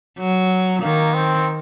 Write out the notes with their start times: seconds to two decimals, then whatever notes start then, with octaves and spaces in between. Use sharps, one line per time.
0.19 F#3
0.82 D#3 A#3
1.14 C4